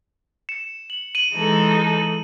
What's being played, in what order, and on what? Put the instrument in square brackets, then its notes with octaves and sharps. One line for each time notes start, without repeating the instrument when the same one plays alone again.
[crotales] C#7 E7
F#7
D#7 F#7
[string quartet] E3 G#3 D#4 A4